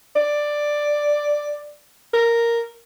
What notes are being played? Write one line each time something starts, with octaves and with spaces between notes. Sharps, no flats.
D5
A#4